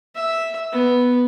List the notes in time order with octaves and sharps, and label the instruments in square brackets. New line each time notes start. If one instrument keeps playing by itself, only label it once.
[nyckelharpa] E5
B3